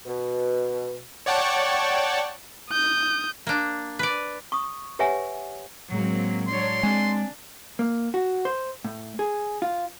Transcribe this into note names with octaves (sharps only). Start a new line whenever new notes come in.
B2
C#5 D5 F#5 G5 A5 C#6
D#6 G6
A#3 D4
B4 D5
C#6 D#6
G4 B4 C#5 E5 F#5 G#5
A2 F#3 G#3 A#3 C4
F#3 D4 C#5 C6
G#3 C4 D4 G#5
A#3
F#4
C5
A2
G#4
F4